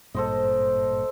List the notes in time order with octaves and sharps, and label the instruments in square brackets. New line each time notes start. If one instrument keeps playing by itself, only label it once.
[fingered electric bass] G#1 G2 A#2 [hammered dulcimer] A4 C5 D#5